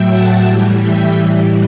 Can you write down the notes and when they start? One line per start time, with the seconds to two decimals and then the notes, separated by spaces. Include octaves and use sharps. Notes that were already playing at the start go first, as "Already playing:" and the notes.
Already playing: A2 F#3 E5 G5
0.09 F#5 A5
0.45 A2 E3 G3
0.81 E5 G5
1.17 A2 E3 G3